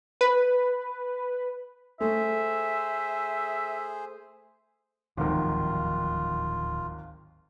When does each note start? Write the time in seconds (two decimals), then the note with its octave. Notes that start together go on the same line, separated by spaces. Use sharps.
0.21 B4
2.00 A3 G#4 C5 E5
5.17 D1 G#1 D#2 D#3 F3 F#3 F4